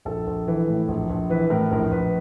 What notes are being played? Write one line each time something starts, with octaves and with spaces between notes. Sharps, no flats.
A#1 A4
A#1
E3
A2
A#1
A#1
E3 B4
A2 A#4
A#1 A#4
A#1 B4